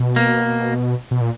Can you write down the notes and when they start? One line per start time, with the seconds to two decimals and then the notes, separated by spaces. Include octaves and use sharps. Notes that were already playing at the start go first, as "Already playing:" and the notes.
Already playing: B2
0.16 A#3
1.11 B2
1.21 A#2